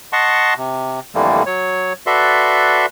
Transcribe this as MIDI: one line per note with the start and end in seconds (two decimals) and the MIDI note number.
0.13 0.54 75
0.13 0.54 78
0.13 0.54 81
0.13 0.54 84
0.13 0.54 85
0.57 1.00 48
1.15 1.43 41
1.15 1.43 50
1.15 1.43 52
1.15 1.43 55
1.15 1.43 57
1.15 1.43 58
1.46 1.93 54
1.46 1.93 73
2.06 2.86 66
2.06 2.86 69
2.06 2.86 71
2.06 2.86 74
2.06 2.86 76
2.06 2.86 84